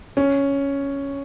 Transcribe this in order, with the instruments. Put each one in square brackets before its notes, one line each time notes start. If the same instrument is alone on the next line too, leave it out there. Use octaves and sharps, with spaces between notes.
[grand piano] C#4